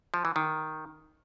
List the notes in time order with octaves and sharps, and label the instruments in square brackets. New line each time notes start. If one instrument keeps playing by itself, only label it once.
[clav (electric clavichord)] F3
E3
D#3